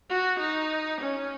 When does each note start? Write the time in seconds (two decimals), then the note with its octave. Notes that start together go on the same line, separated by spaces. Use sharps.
0.10 F#4
0.39 D#4
1.01 C#4